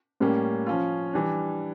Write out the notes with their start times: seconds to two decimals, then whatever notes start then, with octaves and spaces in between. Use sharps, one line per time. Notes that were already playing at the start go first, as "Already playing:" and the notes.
0.20 A2 G3 A#3 C#4
0.66 F3 C#4 F4
1.13 E3 G3 D4